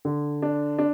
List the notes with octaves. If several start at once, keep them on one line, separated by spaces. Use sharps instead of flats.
D3
D4
D4